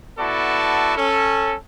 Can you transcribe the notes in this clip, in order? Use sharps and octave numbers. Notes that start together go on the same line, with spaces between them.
B3 E4 F#4 A4 D5 A5
C#4 A4